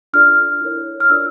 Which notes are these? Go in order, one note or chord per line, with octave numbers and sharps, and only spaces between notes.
D4 F4 A4 D5 F6
E4 A#4 C#5
F6
D4 F4 A#4 D5 E6